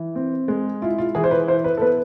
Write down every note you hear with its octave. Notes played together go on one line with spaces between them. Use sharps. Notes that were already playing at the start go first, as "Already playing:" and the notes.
Already playing: E3
C4
G#3
E4 F4
F4
E3 G#4
C5
B4
E4 C5
B4
A4
B3 B4